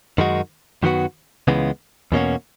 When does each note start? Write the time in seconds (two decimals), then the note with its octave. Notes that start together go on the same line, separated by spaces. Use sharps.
0.18 F#2 D#3 G#3 D#4 F#4
0.83 F#2 D#3 F#3 B3 F#4
1.48 C#2 C#3 E3 G#3 B3
2.12 E2 B2 A#3 C#4 F#4